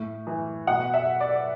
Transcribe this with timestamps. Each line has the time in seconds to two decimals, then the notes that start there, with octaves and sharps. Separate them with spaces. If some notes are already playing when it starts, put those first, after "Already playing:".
Already playing: A2
0.27 E3
0.67 B2 F#5
0.94 E5
1.20 D5